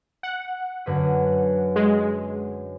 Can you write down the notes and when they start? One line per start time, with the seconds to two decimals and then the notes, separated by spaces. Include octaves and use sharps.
0.23 F#5
0.86 F#2 D3 B4
1.76 G#3